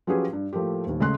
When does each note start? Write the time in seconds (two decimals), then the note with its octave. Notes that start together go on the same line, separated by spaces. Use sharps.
0.07 F3 F#3 C#4 G4 G#4 B4
0.33 G2
0.53 A2 F3 A3 A#3 G4
0.86 D#1 D#2
1.00 C#3 G#3 A3 C6 F#6